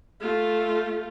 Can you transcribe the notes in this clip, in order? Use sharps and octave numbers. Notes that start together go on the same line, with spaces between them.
A3 F4